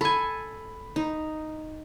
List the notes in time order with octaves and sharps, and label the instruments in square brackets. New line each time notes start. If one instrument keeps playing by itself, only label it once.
[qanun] A4 G#5 [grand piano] B5
[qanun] D#4